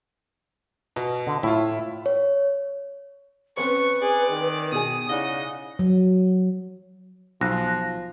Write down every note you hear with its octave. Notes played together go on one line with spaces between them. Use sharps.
B2
D3
A2 E4 F4
C#5
C4 C#4 B4 C5 C#6
G#4 D5
D#3
B2 G#4 G#5 D#6
C#3 D#4 E4 D5 D#5 F#5
F#3
B1 F3 F#6 A#6